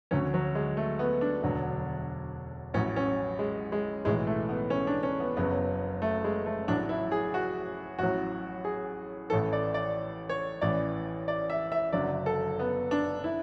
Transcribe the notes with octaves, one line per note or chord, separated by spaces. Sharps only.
D2 D3 F#3 C#4
F#3
G#3
A3
B3
D4
E1 D2 D3 F#3
A1 A2 F#3 C#4
C#4
G#3
G#3
B1 A2 E3 G#3
A3
B3
C#4
D4
C#4
B3
F#1 F#2 C#3 F#3 B3
A3
G#3
A3
A1 A2 F#3 D4
E4
G#4
F#4
A1 A2 F#3 F#4
G#4
A1 A2 E3 A4
D5
D5
C#5
A1 A2 E3 D5
D5
E5
E5
F#1 F#2 D3 F#3 D5
A4
B3
D4
E4